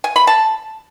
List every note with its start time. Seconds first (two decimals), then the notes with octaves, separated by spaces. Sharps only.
0.04 G#5
0.16 B5
0.27 A5